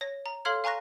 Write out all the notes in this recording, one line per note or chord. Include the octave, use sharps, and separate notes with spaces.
C#5 A#6
A#5
A4 C#5 F5 C6 F6 G#6
F5 G#5 A#5 C#6 F#6 A#6